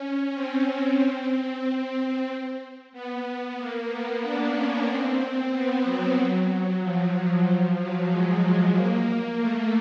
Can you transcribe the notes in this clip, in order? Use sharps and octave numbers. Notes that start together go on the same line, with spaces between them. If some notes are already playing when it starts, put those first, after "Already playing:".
Already playing: C#4
C4
B3
A#3
B3
D4
C#4
C4
B3
F#3
F3
F3
F#3
G#3
A#3
A3